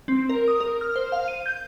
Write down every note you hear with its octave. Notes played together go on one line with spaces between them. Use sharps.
C4
A#4
D#6
A#4
F6
C5
F5
D#7
G6